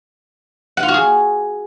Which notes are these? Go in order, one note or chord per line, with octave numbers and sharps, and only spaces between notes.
F#5
F4
F#4
G#4